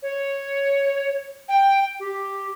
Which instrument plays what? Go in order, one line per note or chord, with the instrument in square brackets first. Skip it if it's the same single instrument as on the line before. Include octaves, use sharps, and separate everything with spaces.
[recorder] C#5
G5
G4